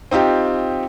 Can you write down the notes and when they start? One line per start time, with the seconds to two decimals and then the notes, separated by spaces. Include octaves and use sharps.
0.11 C4 D#4 F4 G4